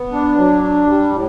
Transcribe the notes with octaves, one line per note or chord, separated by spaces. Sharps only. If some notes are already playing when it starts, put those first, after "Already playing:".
Already playing: B3
D4
F#3
D4
G3
A2